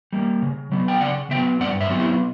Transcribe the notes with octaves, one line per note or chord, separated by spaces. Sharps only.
G3 A#3
C#3
F#3 B3
G5
C#3 D5 F#5
F#3 B3 E5 G5
G2 D5 F#5
C#5 E5
F#3 B3 F#4
E4 G4